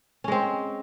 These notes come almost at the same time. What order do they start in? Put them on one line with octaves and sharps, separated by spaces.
C#4 G#3 C4